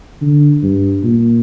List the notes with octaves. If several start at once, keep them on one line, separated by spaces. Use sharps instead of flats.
D3
G2
A#2